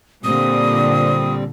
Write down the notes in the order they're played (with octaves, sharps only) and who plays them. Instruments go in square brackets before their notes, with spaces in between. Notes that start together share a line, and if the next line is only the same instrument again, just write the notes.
[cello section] A#2 D3 [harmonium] G3 C4 [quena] D#6